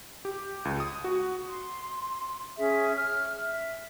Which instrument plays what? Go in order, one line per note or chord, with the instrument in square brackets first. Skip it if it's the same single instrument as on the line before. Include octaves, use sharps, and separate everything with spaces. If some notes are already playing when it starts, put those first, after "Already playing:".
[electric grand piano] G4
C#2
D#6
F#4
[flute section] C6
C#4 G#4 E5
F6
E5